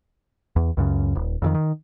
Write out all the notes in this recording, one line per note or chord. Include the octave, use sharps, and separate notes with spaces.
E2
C#2 F#2 C#3
D#1
F2 D3 D#3
D#3